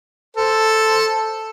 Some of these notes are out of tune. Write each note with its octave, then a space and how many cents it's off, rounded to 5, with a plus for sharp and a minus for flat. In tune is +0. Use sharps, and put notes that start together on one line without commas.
A4 +0 C5 +0